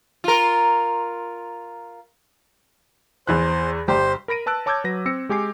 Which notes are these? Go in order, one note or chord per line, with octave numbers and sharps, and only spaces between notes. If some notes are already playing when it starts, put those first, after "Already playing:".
F4 A#4
E2 E3 C5 F#6
G1 G4 C5
A#4 B5 A#6 D7 D#7
B4 A5 E6 F#6 D7
C#5 A5 D6 E6 G6 G#6
F#3 B4 A#6
C4 E6 A#6 C#7
G#3 G4 G#5 D6 C7